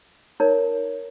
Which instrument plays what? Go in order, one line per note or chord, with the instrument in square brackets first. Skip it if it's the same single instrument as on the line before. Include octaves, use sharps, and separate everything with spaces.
[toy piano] D#4 A#4 C#5